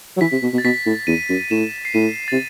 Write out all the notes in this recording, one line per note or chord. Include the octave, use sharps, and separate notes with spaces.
F#3
E3 B6
C3
B2
B2
A6
B2 B6
A2
E2 D#7
F#2
A2 E7
C7
A2 D#7
A6
C3